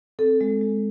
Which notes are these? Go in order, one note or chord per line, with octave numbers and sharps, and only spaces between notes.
C4 A4
G#3
G#3